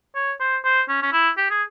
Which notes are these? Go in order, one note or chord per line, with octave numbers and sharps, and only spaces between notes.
C#5
C5
C5
C#4
C#4
E4
G4
G#4